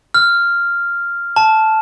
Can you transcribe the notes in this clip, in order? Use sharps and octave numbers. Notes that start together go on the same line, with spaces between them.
F6
A5